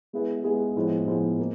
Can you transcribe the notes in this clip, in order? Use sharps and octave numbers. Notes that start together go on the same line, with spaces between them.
G#3 B3 E4 G#4 B4
G#3 B3 E4 G#4 B4
A2 F3 G#3 B3
A2 F3 G#3 B3
A#3